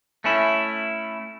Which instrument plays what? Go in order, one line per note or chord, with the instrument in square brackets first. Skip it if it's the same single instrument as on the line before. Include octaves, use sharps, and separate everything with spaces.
[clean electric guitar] A3 C#4 E4